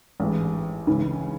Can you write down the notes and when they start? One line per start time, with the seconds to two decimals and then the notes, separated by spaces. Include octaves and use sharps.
0.20 A1 G#2 E3
0.87 C#2 C#3 E3